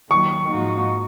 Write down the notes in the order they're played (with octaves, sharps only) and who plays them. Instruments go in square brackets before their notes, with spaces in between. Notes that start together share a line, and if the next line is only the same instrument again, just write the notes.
[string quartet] D#2 D#3 F#3 [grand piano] C#6
[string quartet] G#2 F3 A#3 D#4 F#4